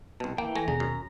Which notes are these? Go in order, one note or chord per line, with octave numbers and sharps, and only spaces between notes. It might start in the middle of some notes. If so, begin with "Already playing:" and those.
C2 B2 A5
E3 A#3 G5
A3 G#5 A#6
D#2 B2 D3 G#4 A#5
F#2